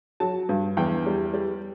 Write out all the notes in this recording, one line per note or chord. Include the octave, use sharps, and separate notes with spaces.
F#3 A5
G2
E2 G5
G3
G3